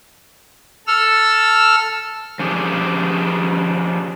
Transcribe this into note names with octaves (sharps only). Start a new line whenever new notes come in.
A4 E6 F6
F3 C#4 D4 G4 G#4